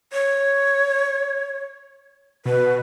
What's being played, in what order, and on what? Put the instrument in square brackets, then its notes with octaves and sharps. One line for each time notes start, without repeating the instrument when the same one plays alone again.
[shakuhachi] C#5
[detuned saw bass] B2 [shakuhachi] B4